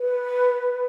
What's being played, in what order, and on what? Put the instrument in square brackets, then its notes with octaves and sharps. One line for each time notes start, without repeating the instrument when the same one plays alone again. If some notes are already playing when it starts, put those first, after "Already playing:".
Already playing: [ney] B4